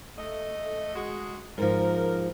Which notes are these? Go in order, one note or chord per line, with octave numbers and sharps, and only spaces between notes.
A3 D#5
G#3 F#4
G#2 F3 A#4